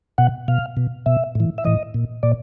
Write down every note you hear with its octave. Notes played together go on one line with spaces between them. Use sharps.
B2 F#5
B2 F5
B2
B2 E5
A2 E3
E5
A2 E3 D#5
A#2
A#2 D5